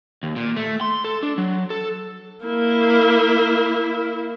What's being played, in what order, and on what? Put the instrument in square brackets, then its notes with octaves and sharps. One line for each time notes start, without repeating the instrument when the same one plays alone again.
[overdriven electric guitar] D#2
A#2
A3
C6
A4
D4
F#3
A4
[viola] A#3 E4